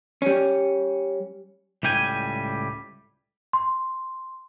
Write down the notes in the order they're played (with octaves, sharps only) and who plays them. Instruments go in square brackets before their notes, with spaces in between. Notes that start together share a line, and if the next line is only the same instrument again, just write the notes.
[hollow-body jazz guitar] G3 C#4
[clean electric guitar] C#2 A2 G3 G5 G#5
[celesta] C6